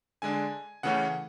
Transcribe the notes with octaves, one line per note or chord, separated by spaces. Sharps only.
D3 G#3 D4 G#5
C#3 E3 A3 C#4 F#5